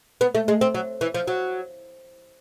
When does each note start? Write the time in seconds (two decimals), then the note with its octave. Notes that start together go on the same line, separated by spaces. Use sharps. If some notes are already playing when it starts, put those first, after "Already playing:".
0.21 B3
0.35 A3
0.48 G#3
0.61 C4
0.74 F#3
1.01 E3
1.14 F3
1.27 F#3